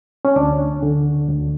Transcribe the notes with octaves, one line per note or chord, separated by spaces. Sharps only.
C#4
D2 D4
D3
D2